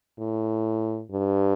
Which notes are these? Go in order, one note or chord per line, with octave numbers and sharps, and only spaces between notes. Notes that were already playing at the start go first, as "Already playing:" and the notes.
A2
G2